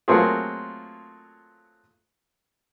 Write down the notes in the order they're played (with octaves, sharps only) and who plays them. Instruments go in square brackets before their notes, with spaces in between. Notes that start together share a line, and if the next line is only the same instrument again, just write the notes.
[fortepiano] F#3 A3 A#3 C4 F4 G#4